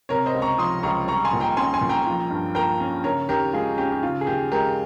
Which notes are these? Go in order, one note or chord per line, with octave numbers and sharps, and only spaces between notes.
C3 A#4 C#5
C5 D#5
C#2
A#5 C#6
F3 C6 D#6
C#2 A#5 C#6
G3 A#5 C#6
G#5 C6
A#2
G5 A#5
C#4 G#5 C6
G#5 C6
A#2
G5 A#5
F3
G2
A#3 G5 A#5
C#4
C#3 A#4 C#5
D#2 G4 A#4
G#3 F4 G#4
C#4 G4
G4
C#3 F4
G#4
D#2 G4
G#3 G4 A#4